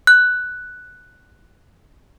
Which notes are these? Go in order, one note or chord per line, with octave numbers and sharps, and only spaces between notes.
F#6